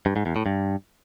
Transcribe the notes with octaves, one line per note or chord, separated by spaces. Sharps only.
G2
G#2
E2
A2
G2